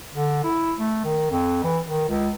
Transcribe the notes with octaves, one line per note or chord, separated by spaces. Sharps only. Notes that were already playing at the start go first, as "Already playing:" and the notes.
D3
E4
A3
D#3
F2
E3
D#3
C#2